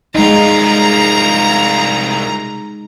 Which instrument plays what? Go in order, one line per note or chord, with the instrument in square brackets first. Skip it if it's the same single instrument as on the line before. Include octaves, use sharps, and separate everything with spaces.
[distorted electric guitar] C2 F4 [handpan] G#3 D#4 [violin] A#5